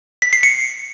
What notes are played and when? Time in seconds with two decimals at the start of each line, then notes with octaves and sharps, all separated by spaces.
0.22 B6
0.33 C7
0.43 C#7